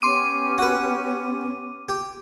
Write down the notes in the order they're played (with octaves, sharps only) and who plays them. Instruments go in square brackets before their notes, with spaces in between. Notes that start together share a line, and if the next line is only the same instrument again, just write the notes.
[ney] B3 [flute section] C#4 G4 [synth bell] C6 D6 D#7
[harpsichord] F#4 B4
G4